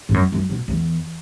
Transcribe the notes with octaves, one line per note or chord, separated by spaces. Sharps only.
G#2
F#2
F#2
B2
E2